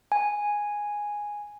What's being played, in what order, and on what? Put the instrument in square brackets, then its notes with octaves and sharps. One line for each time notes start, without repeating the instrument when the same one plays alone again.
[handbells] G#5